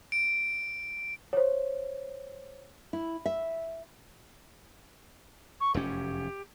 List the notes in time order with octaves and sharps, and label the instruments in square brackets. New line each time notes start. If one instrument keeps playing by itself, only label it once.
[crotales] D7
[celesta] C5 C#5
[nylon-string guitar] E4
E5
[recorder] C#6
[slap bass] F1 F#2 C#4 [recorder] G4